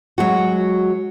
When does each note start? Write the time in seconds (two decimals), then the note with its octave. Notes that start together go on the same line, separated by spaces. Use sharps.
0.18 F#3 G#3 F#4